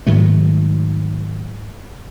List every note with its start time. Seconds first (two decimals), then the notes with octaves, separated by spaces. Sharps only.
0.07 G#2 D#3 F#3 A3